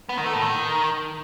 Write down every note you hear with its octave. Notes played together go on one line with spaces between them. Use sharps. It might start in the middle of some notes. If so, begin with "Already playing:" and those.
B3
D#3
A3
A2
D#3